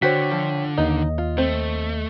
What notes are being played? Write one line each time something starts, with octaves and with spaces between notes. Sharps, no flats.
D3 F#4 C5 C#5 G5 B6
F3
D#2 D#4 D#5
F4
A3 C4